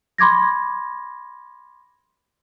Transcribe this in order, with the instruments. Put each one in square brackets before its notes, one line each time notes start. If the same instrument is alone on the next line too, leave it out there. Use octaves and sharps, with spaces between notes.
[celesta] B5 C6 D6 G#6 A#6